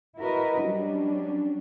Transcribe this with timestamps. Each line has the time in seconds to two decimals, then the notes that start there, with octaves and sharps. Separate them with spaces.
0.18 E4 F#4 A#4 B4 D#5
0.62 F#3 G3 C#4 D4